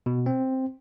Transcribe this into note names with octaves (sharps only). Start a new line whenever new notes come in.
B2
C4